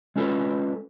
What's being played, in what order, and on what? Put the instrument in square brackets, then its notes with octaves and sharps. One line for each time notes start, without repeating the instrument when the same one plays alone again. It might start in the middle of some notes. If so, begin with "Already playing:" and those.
[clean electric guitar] G#3 C#4 F4 A4 B4